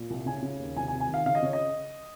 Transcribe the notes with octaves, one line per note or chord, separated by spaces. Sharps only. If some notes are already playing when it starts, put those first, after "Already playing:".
Already playing: A#2
C2
C#3 G#5
C#3
D#2
C2 G#5
G#5
C3
G#5
D#3
F5
C#3 F5
D#5
C#3 C#5
D#5